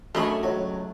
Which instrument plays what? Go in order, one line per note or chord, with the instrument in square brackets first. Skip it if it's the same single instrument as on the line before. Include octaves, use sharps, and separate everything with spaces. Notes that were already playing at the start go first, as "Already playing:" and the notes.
[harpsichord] F#2 G#5 C#6 [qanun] A3 [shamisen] D4 D#5 B5
[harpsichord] C#2 F#3